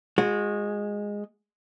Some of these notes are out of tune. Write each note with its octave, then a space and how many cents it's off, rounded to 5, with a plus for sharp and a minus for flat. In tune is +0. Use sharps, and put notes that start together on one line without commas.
G#3 -10 F#4 -40